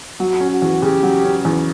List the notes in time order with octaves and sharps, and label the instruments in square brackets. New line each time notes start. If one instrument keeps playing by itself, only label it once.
[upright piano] F#3 [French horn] F#4
[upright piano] C#4
[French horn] F#4
[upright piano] E2
[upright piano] C#3 [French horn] G4
[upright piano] F#3
C#4
E2